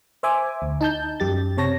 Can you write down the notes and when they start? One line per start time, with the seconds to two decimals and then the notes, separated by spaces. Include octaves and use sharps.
0.23 C5 E5 G#5 D6
0.62 D2
0.81 D#4 A5 G6
1.20 F#2 G4 A6
1.58 C3 C#5 A5 A#6